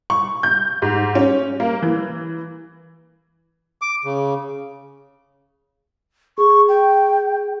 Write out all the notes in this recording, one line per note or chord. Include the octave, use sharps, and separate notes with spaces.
C#6
G6
G#2
C#4
A#3
E3
D6
C#3
G#4 C#6
G5